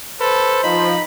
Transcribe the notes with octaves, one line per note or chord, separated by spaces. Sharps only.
A4 B4 C5
F3 D#4 B5